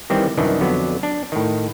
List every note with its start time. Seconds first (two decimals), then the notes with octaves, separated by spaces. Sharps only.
0.10 D#3 E3 G3 C4
0.37 C2 F#2 D#3 E3 D4
0.60 F2 D3 F#3 B3
1.03 D4
1.32 A2 D#3